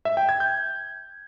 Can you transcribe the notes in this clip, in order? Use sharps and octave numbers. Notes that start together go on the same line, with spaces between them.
E5
G5
G#6
G6